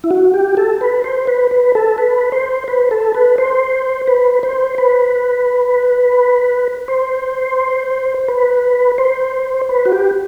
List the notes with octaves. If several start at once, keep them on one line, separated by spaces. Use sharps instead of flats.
E4
F#4
G4
A4
B4
C5
B4
B4
A4
B4
C5
B4
A4
B4
C5
B4
C5
B4
C5
B4
C5
B4
F#4
G4